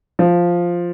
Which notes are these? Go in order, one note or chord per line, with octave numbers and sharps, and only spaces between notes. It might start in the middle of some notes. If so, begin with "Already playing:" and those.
F3